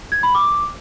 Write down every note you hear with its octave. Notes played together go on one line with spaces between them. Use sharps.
G#6
B5
D6